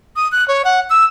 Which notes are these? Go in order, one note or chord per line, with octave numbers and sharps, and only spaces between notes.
D#6
F#6
C#5
F#5
E6